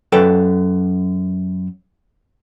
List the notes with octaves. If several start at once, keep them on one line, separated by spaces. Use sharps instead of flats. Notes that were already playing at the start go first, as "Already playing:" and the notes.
F#2 A4 B4 G5